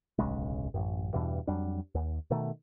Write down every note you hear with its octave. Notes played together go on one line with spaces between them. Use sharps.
D1 B1 C#3 G#3
A1 F#2
E2 G2 B2 E3
F2 F#3 G3 D4
D#2
B2 D#3 A3